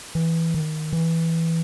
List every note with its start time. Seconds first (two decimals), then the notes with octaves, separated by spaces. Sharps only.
0.15 E3
0.54 D#3
0.93 E3